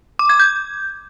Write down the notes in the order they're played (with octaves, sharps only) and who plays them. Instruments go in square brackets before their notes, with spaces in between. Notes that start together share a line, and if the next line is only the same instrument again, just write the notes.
[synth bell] D6
G#6
G6